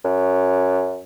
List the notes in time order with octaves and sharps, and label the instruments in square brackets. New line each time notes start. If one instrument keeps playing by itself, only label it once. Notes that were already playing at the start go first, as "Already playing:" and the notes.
[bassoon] F#2